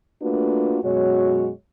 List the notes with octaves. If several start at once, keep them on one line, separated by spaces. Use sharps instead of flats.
A3 A#3 D4 F4 F#4 B4
F#2 B2 G#3 F#4 C#5